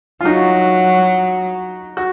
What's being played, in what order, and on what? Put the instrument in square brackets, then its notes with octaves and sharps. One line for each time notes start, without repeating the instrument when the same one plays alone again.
[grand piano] F4
[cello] F#3 [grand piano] D#4 F#4
[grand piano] F#4